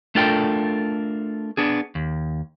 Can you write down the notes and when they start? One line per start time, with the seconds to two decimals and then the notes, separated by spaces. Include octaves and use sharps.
0.15 A3 D4 F4 A4 A#4 G5
1.57 B3 D4 G#4
1.95 D#2